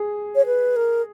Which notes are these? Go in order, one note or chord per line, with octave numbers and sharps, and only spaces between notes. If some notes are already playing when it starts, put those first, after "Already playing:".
Already playing: G#4
C#5
B4
A#4